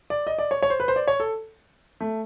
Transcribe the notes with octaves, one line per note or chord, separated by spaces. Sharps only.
D5
D#5
D5
C#5
C#5
C5
B4
C5
D5
C#5
A4
A3